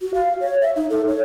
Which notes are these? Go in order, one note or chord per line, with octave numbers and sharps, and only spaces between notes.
F#4
F5
C#5
E5
D#4
A4
C#5